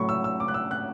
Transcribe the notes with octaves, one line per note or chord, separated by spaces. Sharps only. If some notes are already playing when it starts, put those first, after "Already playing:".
Already playing: A2 F#3 A3 B5 C#6
E6
E6
D6
F#6
E6
F#6